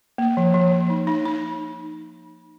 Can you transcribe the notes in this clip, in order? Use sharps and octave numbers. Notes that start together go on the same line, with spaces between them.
A#3
F3
F3
F3
D#4
D#4
D#4